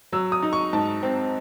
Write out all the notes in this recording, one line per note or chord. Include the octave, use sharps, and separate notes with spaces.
F#3 E6
D#6
D#4
C#6
G#2 A5
C4